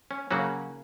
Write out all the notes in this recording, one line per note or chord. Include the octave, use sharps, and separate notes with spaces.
C#4
C#3 F#3 A#3 C#4 F#4